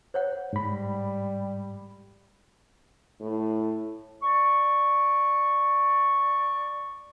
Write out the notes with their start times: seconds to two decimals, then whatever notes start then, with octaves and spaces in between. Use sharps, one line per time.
0.14 C5 C#5 F#5
0.53 G#2 G3 B5
3.21 A2
4.22 D5 C#6